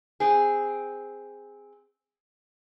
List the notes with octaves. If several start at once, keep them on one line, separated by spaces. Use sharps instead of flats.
C4 G#4